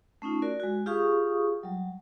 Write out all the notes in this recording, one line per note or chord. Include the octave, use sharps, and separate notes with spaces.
A3 C#4 D#4 F4
F#4 A#4 D5
G#3 F#4
F4 G4 G#4 F5 C#6 D#6
F#3 G3